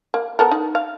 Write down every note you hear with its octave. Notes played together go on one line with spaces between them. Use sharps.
A#3
B3 A4 A#4
D#4
F5